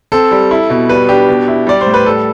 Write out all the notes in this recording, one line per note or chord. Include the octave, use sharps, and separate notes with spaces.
C4 A4
G3
E4
B2
G3 B4
D4 G4
B2
E4
G3 D5
C5
A2
B4
G3 A4